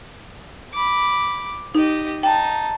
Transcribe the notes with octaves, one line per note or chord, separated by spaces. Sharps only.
B5 D6
D#4 G4 D#5
D#4 G5 A5